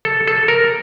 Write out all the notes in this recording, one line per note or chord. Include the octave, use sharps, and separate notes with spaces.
A4
A4
A#4